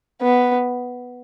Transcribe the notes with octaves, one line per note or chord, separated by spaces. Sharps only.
B3